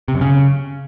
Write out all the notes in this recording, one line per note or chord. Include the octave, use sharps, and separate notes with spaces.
C3
F#2
C#3